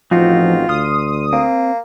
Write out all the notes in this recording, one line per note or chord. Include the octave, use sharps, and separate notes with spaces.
A1 F3 C4 D#4 F4 F#4
D2 C6 D#6 F6
A#3 C4